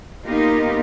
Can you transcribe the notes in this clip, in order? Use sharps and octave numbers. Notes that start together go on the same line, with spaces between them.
A#3 B3 D#4 F4 G4 A#4